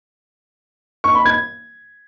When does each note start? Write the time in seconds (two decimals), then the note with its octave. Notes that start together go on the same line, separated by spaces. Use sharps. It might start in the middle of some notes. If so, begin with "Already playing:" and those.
1.04 C#6
1.15 B5
1.26 G#6